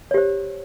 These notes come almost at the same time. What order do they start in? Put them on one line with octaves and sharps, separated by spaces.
C#5 G4 C5